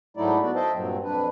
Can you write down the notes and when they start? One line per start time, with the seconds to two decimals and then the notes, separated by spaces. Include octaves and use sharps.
0.17 G#2 F#3 A3 D#4 E4 D5
0.42 B3 F#4 D5
0.55 A4 C5 D#5 E5 G5 A5
0.73 G2 A#2 F#3 C4
1.03 F2 D4 B4